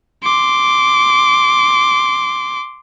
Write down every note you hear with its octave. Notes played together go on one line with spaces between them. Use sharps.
C6 D6